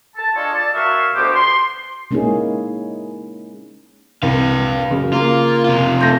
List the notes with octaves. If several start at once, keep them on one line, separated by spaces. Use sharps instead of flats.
A5
D4 F4 G#4 A4 C#5 D#5
D5 A5
A#3 F#4 C#5 E5 F5
D2 B2 B3 G4 C5 D6
C6
G#3 A#3 C#4 D#4 E4 G#4
C2 B4 F5
F#2 C#3
A#3 F4
C3 F4
A3 G6 A#6